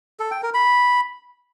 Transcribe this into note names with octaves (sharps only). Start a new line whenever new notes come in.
A4
G5
A#4
B5